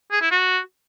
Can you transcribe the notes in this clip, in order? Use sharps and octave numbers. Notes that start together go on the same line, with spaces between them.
G#4
E4
F#4